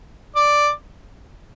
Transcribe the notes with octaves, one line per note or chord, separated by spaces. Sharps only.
D5